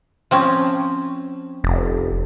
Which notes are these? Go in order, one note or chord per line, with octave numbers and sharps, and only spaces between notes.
F3 C4 C#4
F1